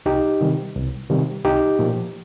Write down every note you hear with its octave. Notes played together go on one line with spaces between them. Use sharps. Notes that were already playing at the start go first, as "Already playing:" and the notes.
C2 D#4 G4
C3 D#3 G3
C2
C3 D#3 G3
C2 D#4 G4
A#2 F3